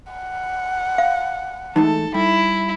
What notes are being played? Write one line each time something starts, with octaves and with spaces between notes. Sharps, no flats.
F#5
F5
E3 G#3 A3 D#4 A4
G3 E4